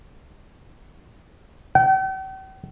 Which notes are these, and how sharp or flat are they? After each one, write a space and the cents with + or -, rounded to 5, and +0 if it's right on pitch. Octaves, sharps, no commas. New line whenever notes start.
G5 -45